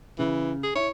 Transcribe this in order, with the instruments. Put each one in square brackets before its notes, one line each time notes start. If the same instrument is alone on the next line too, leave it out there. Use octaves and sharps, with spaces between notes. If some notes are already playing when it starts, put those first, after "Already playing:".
[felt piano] C#3 [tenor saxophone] E3
[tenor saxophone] G#4
[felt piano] E4 [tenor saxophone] C#5